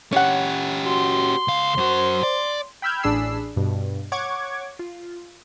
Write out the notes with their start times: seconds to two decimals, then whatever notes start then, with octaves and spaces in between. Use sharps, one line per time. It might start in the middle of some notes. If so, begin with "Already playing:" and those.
0.13 C#4 G4 C#5 F#5
0.86 F#4 C6
1.48 C#2 F5
1.77 F#2 F#4 C5
2.23 D5
2.82 G5 B5 E6 F6 G6 G#6
3.03 A1 D4 G#4 B5 E6 C7
3.56 G2 B2
4.12 C#5 F#5 C#6 D6 G#6
4.79 F4